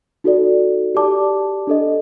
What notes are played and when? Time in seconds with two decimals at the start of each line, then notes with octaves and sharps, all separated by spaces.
0.24 D#4 F#4 A4 D5
0.95 G4 D5 A5 D6
1.67 D4 A4 D#5